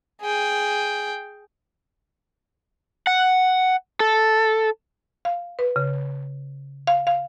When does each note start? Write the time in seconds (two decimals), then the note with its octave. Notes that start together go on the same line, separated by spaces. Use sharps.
0.21 G#4 G5
3.07 F#5
4.00 A4
5.25 F5
5.59 B4
5.76 C#3
6.87 F5
7.07 F5